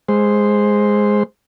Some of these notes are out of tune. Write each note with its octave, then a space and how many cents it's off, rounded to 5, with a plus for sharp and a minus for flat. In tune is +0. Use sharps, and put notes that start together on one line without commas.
G#3 +0 C5 +0